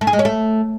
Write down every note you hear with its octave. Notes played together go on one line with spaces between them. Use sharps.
A3
G#4
G#3
C#4
A3